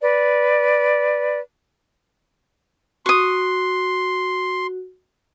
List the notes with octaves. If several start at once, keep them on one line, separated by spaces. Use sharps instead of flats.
B4 D5
F#4 C6 C#6 D#6